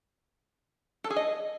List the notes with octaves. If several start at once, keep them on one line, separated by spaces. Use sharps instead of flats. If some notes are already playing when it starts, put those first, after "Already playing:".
A4
G#4
D#5